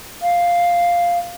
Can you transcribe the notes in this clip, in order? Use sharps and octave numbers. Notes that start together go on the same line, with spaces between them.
F5